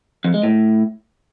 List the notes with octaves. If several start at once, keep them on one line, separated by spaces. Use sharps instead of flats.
F2
G#3
A2